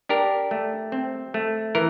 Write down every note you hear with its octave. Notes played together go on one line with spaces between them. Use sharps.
D4 G4 A#4
A3
C4
A3
E3 A#4